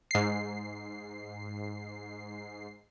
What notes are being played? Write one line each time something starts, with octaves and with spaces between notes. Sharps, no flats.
G#2 C7